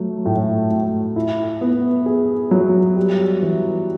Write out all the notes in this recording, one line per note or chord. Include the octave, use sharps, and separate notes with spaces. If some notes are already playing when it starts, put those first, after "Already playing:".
Already playing: F#3 A3
A2
A2
E4
B3
G#4
F#3
G3
E3